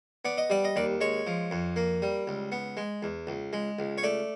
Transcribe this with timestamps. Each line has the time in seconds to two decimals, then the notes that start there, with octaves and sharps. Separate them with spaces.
0.25 B3 D5
0.38 D#5
0.50 G3 D5
0.65 D#5
0.76 D#2 D5
1.01 G#3 C#5
1.27 F3
1.51 F2
1.76 A#3
2.02 G3
2.28 C#2
2.52 B3
2.77 G#3
3.03 E2
3.27 C#2
3.53 G#3
3.79 C#2
3.98 C#5
4.03 A3 D5